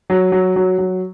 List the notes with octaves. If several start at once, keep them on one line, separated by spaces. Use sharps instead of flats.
F#3
F#3
F#3
F#3